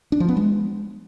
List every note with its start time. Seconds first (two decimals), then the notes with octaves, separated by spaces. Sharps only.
0.12 D4
0.20 F3
0.28 B3
0.37 G#3